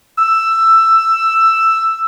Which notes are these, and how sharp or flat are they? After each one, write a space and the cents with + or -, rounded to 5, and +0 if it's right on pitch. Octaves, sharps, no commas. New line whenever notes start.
E6 +10